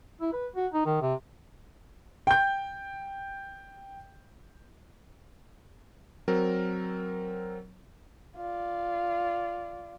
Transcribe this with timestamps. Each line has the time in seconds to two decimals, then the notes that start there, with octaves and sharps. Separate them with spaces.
0.21 E4
0.33 B4
0.56 F#4
0.73 D#4
0.86 D#3
1.02 C3
2.27 G5 G6
6.28 F#3 C4 A#4
8.36 F4 D5